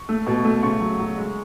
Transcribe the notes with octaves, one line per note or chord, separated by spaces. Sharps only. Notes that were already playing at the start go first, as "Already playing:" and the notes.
Already playing: C#6
A3
B2
A3
C#3 C#6
F#3
F#3
G#3